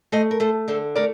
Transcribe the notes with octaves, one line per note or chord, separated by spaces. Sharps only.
A3 C5 D#5
A#4
A3 A4 C5
D3 A4 C5
A3 A#4 D5